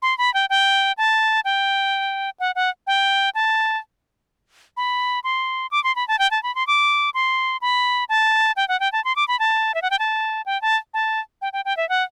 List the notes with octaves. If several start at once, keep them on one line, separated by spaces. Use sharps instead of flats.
C6
B5
G5
G5
A5
G5
F#5
F#5
G5
A5
B5
C6
D6
C6
B5
A5
G5
A5
B5
C6
D6
C6
B5
A5
G5
F#5
G5
A5
C6
D6
B5
A5
E5
F#5
G5
A5
G5
A5
A5
G5
G5
G5
E5
F#5